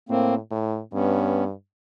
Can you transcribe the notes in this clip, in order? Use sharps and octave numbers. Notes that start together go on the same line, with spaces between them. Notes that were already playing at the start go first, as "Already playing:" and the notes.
A2 A#3 C4
A2
G2 B3 C#4